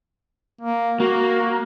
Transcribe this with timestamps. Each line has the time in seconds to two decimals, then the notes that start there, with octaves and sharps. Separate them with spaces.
0.61 A#3
1.00 A#3 F#4